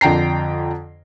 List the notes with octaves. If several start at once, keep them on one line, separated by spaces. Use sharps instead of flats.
F2 D3 G5 A#5 C7